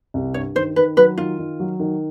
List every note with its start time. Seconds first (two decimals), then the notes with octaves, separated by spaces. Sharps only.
0.14 C2
0.34 G2 C#5
0.55 D#3 C5
0.76 D#3 B4
0.97 F#3 B4
1.18 D#3 F4
1.39 D#3
1.60 F#3
1.80 D#3